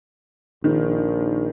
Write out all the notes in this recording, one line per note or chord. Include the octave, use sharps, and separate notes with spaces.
A#1 D#3